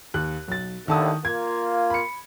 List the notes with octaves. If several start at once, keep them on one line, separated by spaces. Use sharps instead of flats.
D#2 F#6
B1 A6
D#2 A2 D3 D#3 A5 D#6
A#3 F4 G#6
B5 C#7